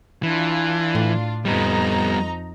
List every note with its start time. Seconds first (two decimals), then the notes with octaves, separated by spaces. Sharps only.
0.23 E3 D4 F4
0.95 A2
1.45 F2 G3 B3 D#4 A#5